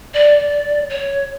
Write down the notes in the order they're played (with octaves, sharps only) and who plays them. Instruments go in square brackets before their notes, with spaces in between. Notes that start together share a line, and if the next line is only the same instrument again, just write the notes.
[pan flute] D5
C#5